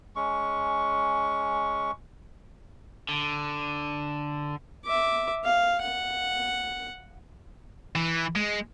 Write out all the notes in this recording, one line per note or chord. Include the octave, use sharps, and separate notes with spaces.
G#3 C#4 C#6
D3
E5 D6
F5
F#5
E3
G#3